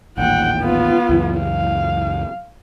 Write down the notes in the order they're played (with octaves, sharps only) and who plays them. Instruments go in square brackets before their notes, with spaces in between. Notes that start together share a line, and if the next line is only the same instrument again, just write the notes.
[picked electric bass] A1 D#2 A#2 [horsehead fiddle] F#5 G5
[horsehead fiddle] B3 F4
[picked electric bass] C#2 F#2 E3
[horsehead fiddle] F5